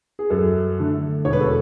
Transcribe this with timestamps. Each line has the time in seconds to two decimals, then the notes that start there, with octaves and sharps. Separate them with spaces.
0.19 G#4
0.30 F#2 A4
0.78 D3 A3
1.25 E1 C#5
1.33 B4
1.41 A4